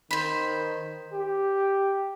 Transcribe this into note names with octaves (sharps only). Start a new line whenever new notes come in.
D#3 C5 B5
G4